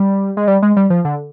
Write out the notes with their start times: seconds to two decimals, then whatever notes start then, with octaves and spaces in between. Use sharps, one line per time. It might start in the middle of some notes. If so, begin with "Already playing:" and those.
Already playing: G3
0.37 G#3
0.48 G3
0.62 G#3
0.77 G3
0.90 F3
1.05 D3